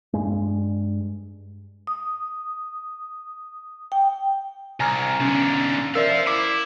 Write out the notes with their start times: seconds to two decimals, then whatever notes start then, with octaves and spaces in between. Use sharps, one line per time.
0.13 G2 G#3
1.87 D#6
3.92 G5
4.80 C2 G#5 A#5 F6
5.20 B1 D3 C#4
5.95 A#4 C5 D5 E5 F5 E6
6.27 E4 D6